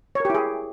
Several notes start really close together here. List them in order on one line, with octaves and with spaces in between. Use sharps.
C#5 A#4 G4 E4 G#4